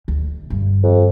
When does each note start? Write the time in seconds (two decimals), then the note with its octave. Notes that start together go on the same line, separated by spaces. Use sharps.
0.08 D2
0.50 G2 D3
0.83 F2